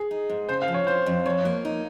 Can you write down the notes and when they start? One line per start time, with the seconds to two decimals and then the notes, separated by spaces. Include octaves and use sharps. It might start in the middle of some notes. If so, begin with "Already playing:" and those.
Already playing: G#4
0.11 D#4
0.30 G#2
0.49 C#3 C5
0.62 F5
0.68 F3
0.74 C#5
0.87 C4 C5
1.06 F2
1.26 F3 C#5
1.45 A#3
1.65 D#4